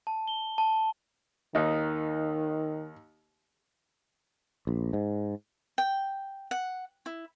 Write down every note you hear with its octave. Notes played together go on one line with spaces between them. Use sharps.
A5
G7
A5
D#2 D#3 D#4
A#1
G#2
G5
F#5
E4